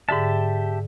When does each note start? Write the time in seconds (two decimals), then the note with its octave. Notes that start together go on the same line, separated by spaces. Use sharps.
0.09 G#2 D3 G4 E5 A5